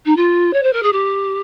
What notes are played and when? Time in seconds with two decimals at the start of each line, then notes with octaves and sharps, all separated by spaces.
0.05 D#4
0.16 F4
0.53 C#5
0.62 C5
0.73 A#4
0.82 G#4
0.92 G4